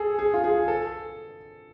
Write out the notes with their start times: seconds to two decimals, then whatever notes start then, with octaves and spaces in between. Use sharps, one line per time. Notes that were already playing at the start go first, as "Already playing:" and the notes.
Already playing: G#4 A4
0.19 G#4
0.34 F4
0.44 G#4
0.68 A4